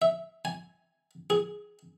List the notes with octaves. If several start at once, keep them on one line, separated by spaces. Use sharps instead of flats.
E5
G#5
G#4